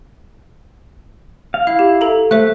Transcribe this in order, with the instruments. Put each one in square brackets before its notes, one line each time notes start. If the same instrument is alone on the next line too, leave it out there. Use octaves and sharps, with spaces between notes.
[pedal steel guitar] F5
[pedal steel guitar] E4 [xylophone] F5
[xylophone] G4
A4 A#5
[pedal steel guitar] A3 [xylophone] C5 E5 F#6